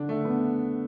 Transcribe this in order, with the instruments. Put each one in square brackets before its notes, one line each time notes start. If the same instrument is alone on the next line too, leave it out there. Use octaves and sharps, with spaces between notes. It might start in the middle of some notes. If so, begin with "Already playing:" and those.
Already playing: [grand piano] D3 D4
A3
D3
B3